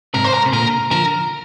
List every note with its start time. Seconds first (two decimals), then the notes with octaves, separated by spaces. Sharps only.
0.14 G#2 C3 A#4
0.24 C5
0.34 A#4
0.46 C3
0.53 A#2 D3 A#4
0.91 D3 F3 A#4